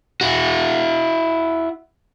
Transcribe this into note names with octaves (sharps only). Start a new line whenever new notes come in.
E4 F#4